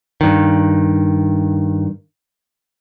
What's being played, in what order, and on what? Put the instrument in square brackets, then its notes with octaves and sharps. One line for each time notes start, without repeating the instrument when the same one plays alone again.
[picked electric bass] G2 D#3